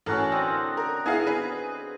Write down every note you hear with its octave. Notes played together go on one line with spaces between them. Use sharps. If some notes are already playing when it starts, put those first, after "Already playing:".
A1 C#4 F#4 A4 A#4
D3 C4 D#5
A#4
B3 E4 G#4 F5
B4